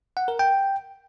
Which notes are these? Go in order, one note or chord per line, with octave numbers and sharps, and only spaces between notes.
F#5
A#4
G5